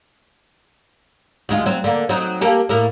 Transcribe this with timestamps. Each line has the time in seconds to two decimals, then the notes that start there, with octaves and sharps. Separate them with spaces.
1.49 D2 G#3 F4
1.66 F#3 C4
1.84 D3 A#3
2.09 F#3 C4 D#4
2.41 A#3 G4 A4
2.69 A2 A#3 A#4